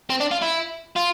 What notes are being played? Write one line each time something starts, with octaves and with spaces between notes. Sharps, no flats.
C4
D4
F4
E4
F4